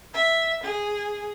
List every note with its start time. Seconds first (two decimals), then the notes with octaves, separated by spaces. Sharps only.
0.13 E5
0.63 G#4